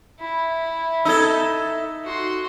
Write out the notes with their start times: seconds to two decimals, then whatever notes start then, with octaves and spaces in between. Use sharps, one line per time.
0.20 E4 E5
1.05 D#4 A4 E6 G#6
2.04 F#4 C6